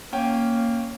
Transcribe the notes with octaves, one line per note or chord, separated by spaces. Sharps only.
A#3 C#4 G5